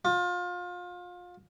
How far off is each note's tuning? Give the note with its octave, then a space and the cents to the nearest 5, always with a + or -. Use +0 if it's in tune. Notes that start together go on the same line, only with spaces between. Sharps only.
F4 +30